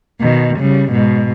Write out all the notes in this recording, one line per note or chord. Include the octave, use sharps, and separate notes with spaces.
B2 D#3
C#3 G3
G#2 B2